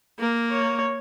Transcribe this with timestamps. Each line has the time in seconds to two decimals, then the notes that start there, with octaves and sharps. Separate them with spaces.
0.19 A#3
0.51 C#5